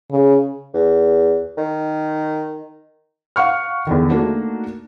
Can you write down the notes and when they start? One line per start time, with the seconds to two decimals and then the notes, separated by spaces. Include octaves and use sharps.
0.11 C#3
0.74 E2
1.58 D#3
3.36 F5 F#5 C#6 F6
3.87 E2 D3 D#3
4.10 A3 A#3 D4 D#4 F#4